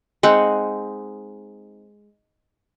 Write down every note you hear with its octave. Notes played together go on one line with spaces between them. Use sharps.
G#3 C4 D#4 F#5